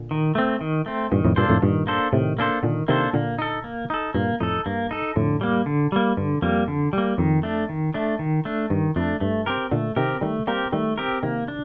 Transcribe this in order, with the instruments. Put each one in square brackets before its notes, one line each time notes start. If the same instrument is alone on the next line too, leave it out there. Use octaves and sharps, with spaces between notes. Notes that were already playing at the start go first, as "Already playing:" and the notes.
Already playing: [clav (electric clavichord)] A#2 D3
[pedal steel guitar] D#3
A3 C4
D#3
A3 C4
[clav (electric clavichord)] G2 A#2 [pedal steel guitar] D#3
[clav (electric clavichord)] F2 A2
[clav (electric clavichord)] G2 A#2 [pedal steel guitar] A#3 D4 A4 C5
[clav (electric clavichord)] F2 A2
[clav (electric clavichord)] G2 A#2 [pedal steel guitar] D#3
[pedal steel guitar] A#3 D4 A4 C5
[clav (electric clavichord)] A2 C3 [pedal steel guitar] D#3
[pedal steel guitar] A#3 D4 A4 C5
[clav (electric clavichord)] A#2 D3 [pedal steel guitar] D#3
[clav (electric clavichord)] C3 D#3 [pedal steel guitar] A#3 D4 A4 C5
[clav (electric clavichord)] A#2 D3 [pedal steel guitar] A#3
[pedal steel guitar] D#4 A4
A#3
D#4 A4
[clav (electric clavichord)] G2 A#2 [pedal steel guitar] A#3
[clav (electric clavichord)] F2 A2 [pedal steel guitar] D#4 A4
[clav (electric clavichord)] G2 [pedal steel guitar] A#3
[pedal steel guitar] D#4 A4
[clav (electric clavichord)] F2 A2 [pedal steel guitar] D3
[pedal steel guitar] G3 A#3
D3
G3 A#3
[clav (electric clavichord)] G2 [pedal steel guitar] D3
[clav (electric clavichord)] F2 [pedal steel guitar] G3 A#3
[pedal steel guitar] D3
G3 A#3
[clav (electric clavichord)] F2 [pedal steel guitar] D#3
[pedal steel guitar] A3 D4
D#3
A3 D4
D#3
A3 D4
[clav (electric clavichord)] G2 [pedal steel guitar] D#3
[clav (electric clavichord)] F2 [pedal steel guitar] A3 D4
[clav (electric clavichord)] G2 [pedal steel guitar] A3
[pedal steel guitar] C4 G4 A#4
[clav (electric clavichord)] A#2 D3 [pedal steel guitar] A3
[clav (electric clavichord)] C3 D#3 [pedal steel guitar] C4 G4 A#4
[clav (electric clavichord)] D#3 G3 [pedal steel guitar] A3
[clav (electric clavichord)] G3 A#3 [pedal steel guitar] C4 G4 A#4
[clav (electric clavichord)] D#3 G3 [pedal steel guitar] A3
[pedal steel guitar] C4 G4 A#4
[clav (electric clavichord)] C3 D#3 [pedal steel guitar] A#3
[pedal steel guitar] D4